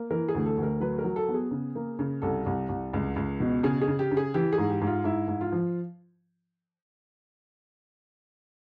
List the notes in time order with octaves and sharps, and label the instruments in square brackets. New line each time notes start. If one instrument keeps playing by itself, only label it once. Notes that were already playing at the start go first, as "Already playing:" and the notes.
Already playing: [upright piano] A#3
E3 A#4
G#4
D2
A4
D2
A#4
F#3 B4
A#4
F#3
A4
B3
G#4
C#3
A#3
C#3
C2 A4
C2
C2
C#2
C#2
B2
C#3 G#4
G#4
C#3
G4
C#3
G#4
E3 G4
G#4
G#2
G4
G#2
F4
G#2 E4
G#2
F4
F3